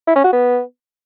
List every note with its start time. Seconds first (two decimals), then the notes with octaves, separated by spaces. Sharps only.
0.07 E4
0.16 C#4
0.24 F#4
0.33 B3